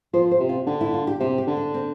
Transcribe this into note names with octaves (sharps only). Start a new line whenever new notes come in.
F3 C5
C5
C3
F4
D3 G4
E4
F4
G4
C3 G4
G4
D3
D4
C4